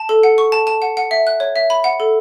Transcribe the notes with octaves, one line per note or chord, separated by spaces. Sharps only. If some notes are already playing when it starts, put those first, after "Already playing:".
Already playing: A5
A4
F#5
C#6
A5
A5
F#5
F#5
E5
F#6
C#5
E5
B5
F#5
A4